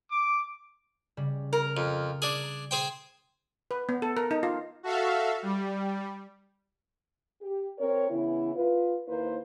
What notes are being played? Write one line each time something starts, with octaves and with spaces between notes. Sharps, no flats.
D6
C#3 G3
A#4
F2
D4 G#4
G#4 C5 G5
B4
B3
A4
A#4
D#4
F4
F#4 A4 E5 F5
G3
G4
C4 A#4 C#5
C#3 E3 B3 E4
F4 B4
D#2 A#3 E4 B4 C5